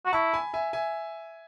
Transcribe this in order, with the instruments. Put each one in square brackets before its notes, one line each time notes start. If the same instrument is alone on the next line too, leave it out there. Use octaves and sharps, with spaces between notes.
[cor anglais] F#4
[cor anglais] E4 [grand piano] A5 C#6
[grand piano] G#5 B5
E5 G#5
E5 G#5